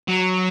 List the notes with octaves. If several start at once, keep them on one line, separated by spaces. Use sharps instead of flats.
F#3